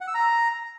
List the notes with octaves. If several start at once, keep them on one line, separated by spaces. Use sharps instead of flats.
F#5
E6
A#5